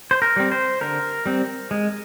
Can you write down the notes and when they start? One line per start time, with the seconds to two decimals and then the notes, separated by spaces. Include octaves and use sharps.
0.11 C5
0.22 A#4
0.36 G3 C4
0.52 C5
0.81 D3 A#4
1.26 G3 C4
1.71 G#3